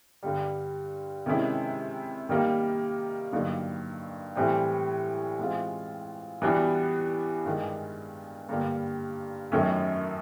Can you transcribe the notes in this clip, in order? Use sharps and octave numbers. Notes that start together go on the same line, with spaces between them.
G2 D3 G3
C3 D#3 G#3 C#4 E4
D#3 G3 A#3
G2 D3 F#3 A#3 D#4
A2 E3 G3 C4
E3 G#3 C4 F4
E3 G3 B3 D4 F#4
G2 D#3 G#3
G2 D3 G3 A#3
F#2 D#3 F#3 A3 C#4